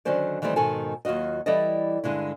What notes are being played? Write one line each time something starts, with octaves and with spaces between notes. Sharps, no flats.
D3 D#3 F#3 C#4 C5 D5
D#3 E3 G3 A3 C4 D#4
G#2 B2 D#3 A4 G#5
D#2 F#3 F4 F#4 D#5
E3 G3 E4 A4 D5 D#5
G2 D3 G#3 E4